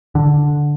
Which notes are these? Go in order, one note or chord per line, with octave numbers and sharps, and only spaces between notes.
D3